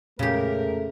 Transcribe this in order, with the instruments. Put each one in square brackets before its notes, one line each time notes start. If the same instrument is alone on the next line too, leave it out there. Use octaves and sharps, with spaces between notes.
[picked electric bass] F2 A#2 G#3 [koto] C#3 G4 [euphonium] A3 [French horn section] A#4